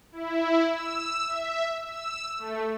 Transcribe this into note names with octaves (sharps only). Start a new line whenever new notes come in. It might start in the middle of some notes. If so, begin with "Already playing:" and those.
E4
E6
E5
E6
A3